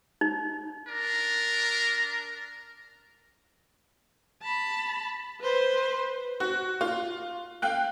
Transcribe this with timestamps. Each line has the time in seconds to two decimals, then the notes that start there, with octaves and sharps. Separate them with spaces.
0.21 D#4
0.88 D4 A#4
4.43 A5 B5
5.40 B4 C5
6.40 F#4
6.81 F4
7.62 F5 G5 F#6